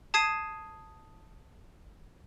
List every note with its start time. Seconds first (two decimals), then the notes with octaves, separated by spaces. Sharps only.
0.14 A5 D#6 G#6 C7 D#7